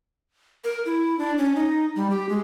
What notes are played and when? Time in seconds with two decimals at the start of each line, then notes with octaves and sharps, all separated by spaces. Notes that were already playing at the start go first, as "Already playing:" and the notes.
0.64 A#4
0.86 E4
1.19 D4
1.38 C#4
1.55 D#4
1.96 G3
2.10 G4
2.29 G#3